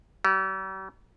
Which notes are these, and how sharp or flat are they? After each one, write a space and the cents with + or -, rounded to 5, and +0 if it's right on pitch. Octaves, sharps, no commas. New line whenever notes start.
G3 -45